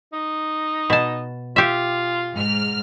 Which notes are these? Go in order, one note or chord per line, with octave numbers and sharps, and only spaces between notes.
D#4
B2 A5
F4 G4 E5
G#2 F6